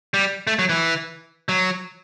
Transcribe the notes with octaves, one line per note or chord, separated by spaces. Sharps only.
G3
A3
F#3
E3
F#3